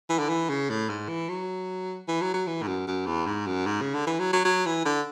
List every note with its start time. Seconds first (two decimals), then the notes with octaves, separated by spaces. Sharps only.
0.10 E3
0.19 D3
0.29 E3
0.49 C#3
0.70 A2
0.89 G#2
1.09 E3
1.29 F#3
2.08 E3
2.21 F#3
2.34 F#3
2.47 E3
2.62 G#2
2.67 F#2
2.87 F#2
3.06 E2
3.26 G#2
3.47 F#2
3.66 G#2
3.82 C#3
3.94 D3
4.07 E3
4.19 F#3
4.33 F#3
4.45 F#3
4.66 E3
4.85 D3